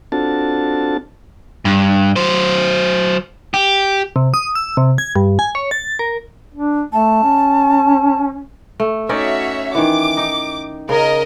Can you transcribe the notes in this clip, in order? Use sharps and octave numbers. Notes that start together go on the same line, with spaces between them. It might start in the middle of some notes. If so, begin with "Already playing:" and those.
C4 D4 F4 F#4 A4 A5
G2
F#3 C5
G4
C3
D#6
E6
C3
G#6
G2
G#5
C#5
A6
A#4
D4
A3 A5
C#4
A3
C#4 D#4 F#4 C#5 D5 E5
D#3 E3 D6
D#4
C#3 A#4 D#5